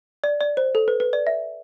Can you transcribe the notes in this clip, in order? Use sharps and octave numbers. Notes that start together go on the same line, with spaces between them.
D5
D5
C5
A4
B4
B4
D5
E5